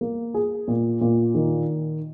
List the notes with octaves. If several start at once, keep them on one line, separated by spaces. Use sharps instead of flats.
A#3
G#4
A#2
A#2
D#3